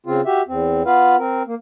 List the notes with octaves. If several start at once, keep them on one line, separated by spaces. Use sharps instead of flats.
C#3 C4 F4
F#4 G4 E5
E2 C4
B3 F4 B4 F5
C4 A#4
A#3